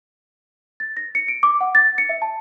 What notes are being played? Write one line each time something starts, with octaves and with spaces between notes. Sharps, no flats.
A6
A#6
C#7
D7
D6
F#5
A6
C#7
E5
A5